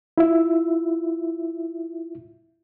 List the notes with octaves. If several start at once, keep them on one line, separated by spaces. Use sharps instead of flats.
E4 F4 E5